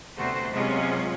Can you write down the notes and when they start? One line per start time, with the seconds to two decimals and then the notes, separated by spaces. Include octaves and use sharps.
0.17 D2 C3 A3 B3 F#4 C5
0.51 C3 F#3 G#3 B3 C#4 F4